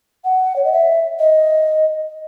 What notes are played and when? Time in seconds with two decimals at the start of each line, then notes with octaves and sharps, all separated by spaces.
0.25 F#5
0.56 C#5
0.65 D#5
0.73 E5
1.19 D#5